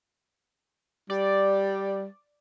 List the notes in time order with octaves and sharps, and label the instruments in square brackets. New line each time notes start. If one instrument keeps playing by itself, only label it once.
[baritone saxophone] G3 [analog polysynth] D5